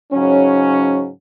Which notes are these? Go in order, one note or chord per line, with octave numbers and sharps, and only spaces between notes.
G#2 C#3 F#3 C#4